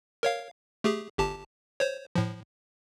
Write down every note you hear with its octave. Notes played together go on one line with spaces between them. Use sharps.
A#4 C#5 F5
A3 G4 G#4
G1 G4 A5
C5 C#5
A2 F3